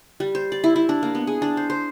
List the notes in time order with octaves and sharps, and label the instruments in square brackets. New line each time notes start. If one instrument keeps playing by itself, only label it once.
[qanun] G3
C5
D5
E4
E4
D4
A#3
B3
G#4
D4
C5
C5